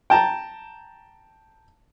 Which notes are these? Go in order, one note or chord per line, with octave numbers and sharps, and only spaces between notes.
G5 A5 A#5